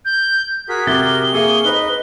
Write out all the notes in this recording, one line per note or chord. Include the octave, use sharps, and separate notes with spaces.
G6
F#4 G#4 A#4 B6
C3 G4 A6 G7
A#3 G#4 E5 C#6 D#6
D#4 B4 C5 D#5